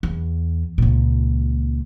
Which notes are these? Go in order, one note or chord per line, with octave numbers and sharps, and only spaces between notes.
E2
C#2 A#2